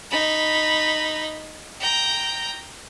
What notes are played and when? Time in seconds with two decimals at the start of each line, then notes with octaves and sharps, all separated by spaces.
0.11 D#4 B5
1.80 G5 A#5